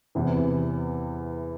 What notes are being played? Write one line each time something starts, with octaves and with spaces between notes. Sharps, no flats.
E2 C3 E3